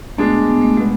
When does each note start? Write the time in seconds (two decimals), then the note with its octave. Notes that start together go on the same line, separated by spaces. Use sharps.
0.17 B2 G#3 A3 D4
0.48 B3
0.62 A3
0.77 B2 G#3 B3